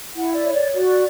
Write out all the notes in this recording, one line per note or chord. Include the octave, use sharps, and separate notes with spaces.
E4 F#5
D5
C#5
D5
F#4 D5